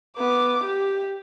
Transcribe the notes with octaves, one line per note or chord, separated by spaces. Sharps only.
B3 D6
G4